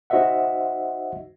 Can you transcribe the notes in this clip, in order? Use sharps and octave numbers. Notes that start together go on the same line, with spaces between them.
D#4 F#4 C5 D#5 E5 F#5